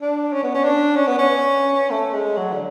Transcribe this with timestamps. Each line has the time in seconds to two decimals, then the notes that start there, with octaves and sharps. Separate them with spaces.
0.01 D4
0.33 C#4
0.43 B3
0.54 C#4
0.64 D4
0.96 C#4
1.07 B3
1.18 C#4
1.90 A3
2.14 G#3
2.37 F#3
2.53 D3